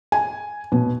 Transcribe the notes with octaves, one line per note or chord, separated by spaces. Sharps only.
G#5
B2